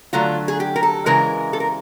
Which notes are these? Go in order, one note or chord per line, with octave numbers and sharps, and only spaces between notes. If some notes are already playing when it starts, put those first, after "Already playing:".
D3 F#3 A3 F4
G#4
G4
A#4
A4
C#3 E3 G#3 A#4
A4
A#4